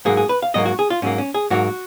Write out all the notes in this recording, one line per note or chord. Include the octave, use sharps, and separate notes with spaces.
G#2 F#3 A#3 G#4
G#4
B4
F5
G#2 F#3 A#3 D#5
F#4
G#4
F4
G#2 F#3 A#3 C#4
C#4
G#4
G#2 F#3 A#3 F#4